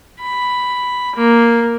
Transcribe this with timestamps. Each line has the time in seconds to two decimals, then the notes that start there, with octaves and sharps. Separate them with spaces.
0.20 B5
1.15 A#3